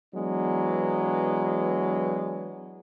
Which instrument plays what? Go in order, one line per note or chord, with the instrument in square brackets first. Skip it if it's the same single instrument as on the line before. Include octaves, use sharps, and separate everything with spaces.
[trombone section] E3 F#3 G#3 B3 D4